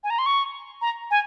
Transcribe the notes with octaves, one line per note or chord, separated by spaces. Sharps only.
G#5
A#5
C6
C#6
A#5
G#5